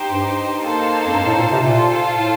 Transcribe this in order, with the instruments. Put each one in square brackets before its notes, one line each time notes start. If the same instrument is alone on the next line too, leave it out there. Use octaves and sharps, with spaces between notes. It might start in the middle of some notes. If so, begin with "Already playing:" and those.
Already playing: [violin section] D#4 G4 C5
[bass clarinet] G2
[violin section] A#3 D#4 A4 C5 F5
[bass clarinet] F2
G2
A2
A#2
C3
[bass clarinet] A#2 [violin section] F4 A4 C5
[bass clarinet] A2